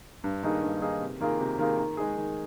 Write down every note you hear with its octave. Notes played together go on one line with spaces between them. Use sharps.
G2
D#3 A#3 D#4 G#4
G2
D#3 A#3 D#4 G#4
C3
D#3 A#3 F4 G#4
C3
D#3 A#3 F4 G#4
D#3
G#3 D#4 G#4
D#3